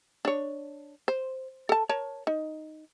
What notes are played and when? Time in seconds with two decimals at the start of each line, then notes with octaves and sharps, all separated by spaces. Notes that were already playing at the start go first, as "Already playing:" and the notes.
0.25 D4 C#5
1.08 C5
1.69 A4 A5
1.89 A#4 C#5 A5
2.27 D#4